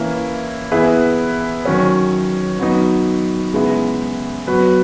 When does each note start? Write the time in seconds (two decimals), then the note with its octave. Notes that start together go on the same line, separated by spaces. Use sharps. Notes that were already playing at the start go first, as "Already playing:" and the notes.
Already playing: E3 A#3 C#4 E4
0.72 E3 B3 E4 G#4 B4
1.65 D#3 F#3 C#4
2.59 F#3 B3 D#4
3.53 C#3 G#3 B3 E4
4.47 F#3 B3 F#4 B4